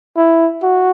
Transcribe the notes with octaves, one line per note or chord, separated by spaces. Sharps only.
E4
F#4